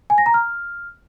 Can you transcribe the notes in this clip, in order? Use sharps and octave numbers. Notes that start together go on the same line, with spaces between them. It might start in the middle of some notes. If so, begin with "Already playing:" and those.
G#5
A#6
A#5
F6